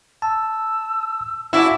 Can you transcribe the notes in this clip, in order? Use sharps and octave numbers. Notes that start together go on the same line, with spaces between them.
A5 E6
E4 F#4 D5 E5 F5 G#5 A5